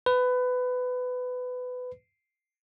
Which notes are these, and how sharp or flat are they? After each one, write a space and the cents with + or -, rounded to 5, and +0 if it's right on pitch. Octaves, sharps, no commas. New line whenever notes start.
B4 +20